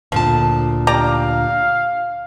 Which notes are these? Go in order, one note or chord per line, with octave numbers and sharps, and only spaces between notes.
D2 A#2 F3 A5
G4 D5 F5 A#5